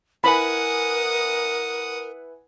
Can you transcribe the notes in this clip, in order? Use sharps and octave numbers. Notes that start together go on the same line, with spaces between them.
E4 A#4 B4 F#5 G#5 B5 D#6